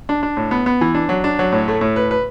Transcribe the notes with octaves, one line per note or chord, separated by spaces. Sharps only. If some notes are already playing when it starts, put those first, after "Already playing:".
D4
D4
A2
B3
B3
E3
D4
F#3
D4
F#3
A2
A3
A2
B4
B4